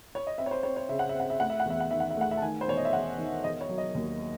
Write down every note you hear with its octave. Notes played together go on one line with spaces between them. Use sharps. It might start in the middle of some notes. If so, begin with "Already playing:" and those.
C#5
D#5
C4 E5
C#5
C5
C4 C#5
C#5
C#3 E5
F#5
E5
C4
F#5
E5
A3 F#5
E5
F#5
E2 E5
F#5
D#3 E5
F#5
E5
A3 F#5
E5
A5
D#3 G#5
C5
E1 C#5
D#5
E5
E1 F#5
D#3
E1 D#5
C#5
F#3
D#5
D#2